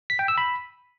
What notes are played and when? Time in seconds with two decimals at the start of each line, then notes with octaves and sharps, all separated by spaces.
0.10 B6
0.19 G5
0.28 E6
0.38 B5